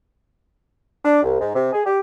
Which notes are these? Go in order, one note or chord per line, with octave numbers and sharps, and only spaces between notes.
D4
C2
G#2
C3
G#4
G4